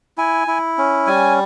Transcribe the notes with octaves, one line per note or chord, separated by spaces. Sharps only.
E4 G#5
E4
C#4
G3 G#5